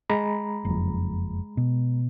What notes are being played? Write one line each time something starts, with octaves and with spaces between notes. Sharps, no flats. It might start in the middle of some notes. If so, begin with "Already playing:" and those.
G#3 A#5 B5
F#1 F2
B2